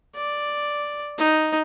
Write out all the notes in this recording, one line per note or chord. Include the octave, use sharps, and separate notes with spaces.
D5
D#4